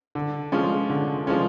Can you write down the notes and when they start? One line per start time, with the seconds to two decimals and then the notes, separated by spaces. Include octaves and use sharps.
0.15 D3
0.52 F3 G#3 C#4
0.90 D3
1.27 F3 G#3 C#4